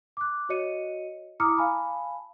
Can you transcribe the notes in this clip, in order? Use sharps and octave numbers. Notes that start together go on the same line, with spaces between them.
D6 F#6
F#4 C#5 D#5 C#7 D#7
E4 A#5 D6 D#6 F6 C#7
F5 G#5 A5 B5